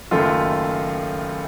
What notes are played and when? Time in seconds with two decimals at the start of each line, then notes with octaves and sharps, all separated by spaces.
0.11 F#1 F#2 D#3 A3 F4